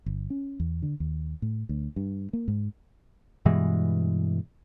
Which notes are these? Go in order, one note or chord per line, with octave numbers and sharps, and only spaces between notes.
G1
C#4
E2
D3
D#2
A2
D2
G2
A#3
G#2
G2 B2 E3 G#3